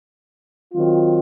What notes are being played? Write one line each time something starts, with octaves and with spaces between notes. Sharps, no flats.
D#3 F#3 C4 F4